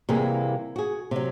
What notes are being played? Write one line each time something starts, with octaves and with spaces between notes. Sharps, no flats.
C3 E3 G3 A#3 G#4
F#4 G#4
C3 F#3